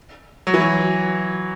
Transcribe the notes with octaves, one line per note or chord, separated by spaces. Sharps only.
F#3
E3
F#3